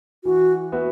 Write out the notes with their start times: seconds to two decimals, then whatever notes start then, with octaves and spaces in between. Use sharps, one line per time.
0.24 E3 F#4
0.72 B3 F#4 B4 E5